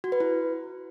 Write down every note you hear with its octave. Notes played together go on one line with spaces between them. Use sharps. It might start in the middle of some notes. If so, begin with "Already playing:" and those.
F#4
B4
E4